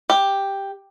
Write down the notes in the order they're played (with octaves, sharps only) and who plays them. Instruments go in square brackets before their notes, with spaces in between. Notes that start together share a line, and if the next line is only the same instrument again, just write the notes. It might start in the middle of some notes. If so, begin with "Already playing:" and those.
[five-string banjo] G4